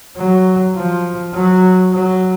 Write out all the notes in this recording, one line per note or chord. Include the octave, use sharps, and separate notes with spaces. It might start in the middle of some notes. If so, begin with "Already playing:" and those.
F#3
F3
F#3
F#3